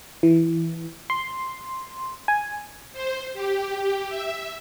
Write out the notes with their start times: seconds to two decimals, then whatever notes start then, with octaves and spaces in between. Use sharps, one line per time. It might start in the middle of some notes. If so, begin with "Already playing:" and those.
0.23 E3
1.10 C6
2.28 G#5
2.93 C5
3.34 G4
3.75 G4
4.09 E5